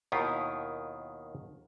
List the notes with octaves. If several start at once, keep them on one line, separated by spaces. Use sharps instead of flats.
D#2 B2 D#3 E4 F4